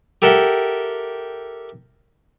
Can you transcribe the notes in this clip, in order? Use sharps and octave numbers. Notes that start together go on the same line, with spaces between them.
G4 A4 A#4 E5 F#5 G5